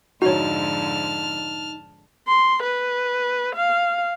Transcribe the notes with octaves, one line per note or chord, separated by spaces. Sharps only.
F2 G#2 D3 D#4 F#4 C#5 A5 F6
C6
B4
F5